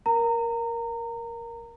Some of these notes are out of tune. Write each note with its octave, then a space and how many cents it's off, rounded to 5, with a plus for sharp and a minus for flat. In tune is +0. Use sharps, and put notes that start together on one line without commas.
A#4 +10 A#5 -25